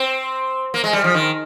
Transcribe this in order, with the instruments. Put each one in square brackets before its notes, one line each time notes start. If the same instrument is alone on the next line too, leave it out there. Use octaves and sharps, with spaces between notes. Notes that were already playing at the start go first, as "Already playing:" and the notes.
Already playing: [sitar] C4
A#3
G#3
G3
F3
D#3